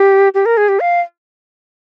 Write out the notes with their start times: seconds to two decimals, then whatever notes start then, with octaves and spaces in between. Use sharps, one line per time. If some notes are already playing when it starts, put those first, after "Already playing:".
Already playing: G4
0.34 G4
0.46 A#4
0.57 G#4
0.69 G4
0.80 F5